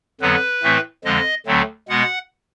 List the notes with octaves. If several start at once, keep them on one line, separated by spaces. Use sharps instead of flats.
F2 D3 F#3 B3 B4
A2 E3 A3 C4
F2 D3 F3 G#3 D#5
D2 D3 F#3 A3 C4
B2 G#3 B3 F#5